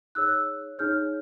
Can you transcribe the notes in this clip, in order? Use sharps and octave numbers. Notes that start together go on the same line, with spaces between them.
D#4 G#4 C#5 E6 F#6
D#4 G#4 C#5 F6 G6